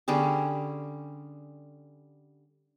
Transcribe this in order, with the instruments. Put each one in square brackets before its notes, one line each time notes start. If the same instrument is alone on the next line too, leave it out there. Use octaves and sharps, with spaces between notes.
[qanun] D3 G3 C#4 G#4